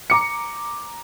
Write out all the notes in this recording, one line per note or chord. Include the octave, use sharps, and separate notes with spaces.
A#5 D6 C#7